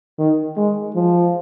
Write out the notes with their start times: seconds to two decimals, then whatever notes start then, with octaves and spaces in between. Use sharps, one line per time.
0.19 D#3
0.57 G#3
0.95 F3